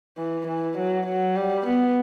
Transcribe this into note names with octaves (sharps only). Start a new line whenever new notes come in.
E3
E3
F#3
F#3
G3
B3